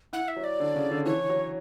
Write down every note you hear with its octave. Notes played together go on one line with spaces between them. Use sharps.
E4 F#5
E5
F#3
D5
D3
C#3
D3
E3 C#5
F#3